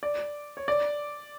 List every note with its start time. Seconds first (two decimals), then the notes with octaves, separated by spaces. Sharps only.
0.03 D5
0.57 C#5
0.68 D5